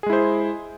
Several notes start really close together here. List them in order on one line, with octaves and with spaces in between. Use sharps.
G#4 G#3 E4 C5